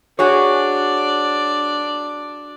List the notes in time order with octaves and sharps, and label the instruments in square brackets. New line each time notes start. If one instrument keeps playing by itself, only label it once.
[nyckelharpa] D4 D5 [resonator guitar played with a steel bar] F#4 G#4 C#5